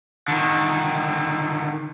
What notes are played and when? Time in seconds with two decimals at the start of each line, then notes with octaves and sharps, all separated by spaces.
0.28 D3 D#3